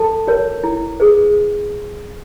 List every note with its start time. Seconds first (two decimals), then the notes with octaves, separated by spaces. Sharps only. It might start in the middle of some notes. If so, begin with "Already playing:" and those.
Already playing: A4 A5
0.27 F#4 A#4 C#5
0.64 E4
1.00 G#4 B4